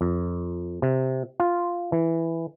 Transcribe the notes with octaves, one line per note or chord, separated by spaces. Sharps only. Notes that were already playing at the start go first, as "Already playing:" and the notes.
F2
C3
F4
E3